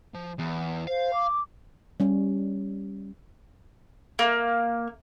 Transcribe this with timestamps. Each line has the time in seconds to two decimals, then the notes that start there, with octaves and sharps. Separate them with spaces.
0.14 F3
0.39 E2
0.87 C5 F5
1.14 D6
2.00 G3 C#4
4.19 A#3